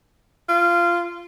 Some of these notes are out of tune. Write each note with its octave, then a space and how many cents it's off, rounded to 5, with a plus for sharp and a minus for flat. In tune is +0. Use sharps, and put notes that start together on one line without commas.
F4 -15